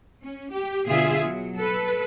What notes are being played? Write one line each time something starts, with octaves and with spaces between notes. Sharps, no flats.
C#4
G4
B2 D3 F4 G#4 E5
F#3
A4 B4